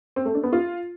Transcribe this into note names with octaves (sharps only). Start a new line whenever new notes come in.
C4
A3
D4
B3
F4